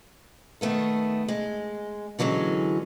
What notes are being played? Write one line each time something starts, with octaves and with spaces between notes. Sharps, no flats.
D#3 A3 B3 A4
G#3
D3 E3 F#3 G#3 C#4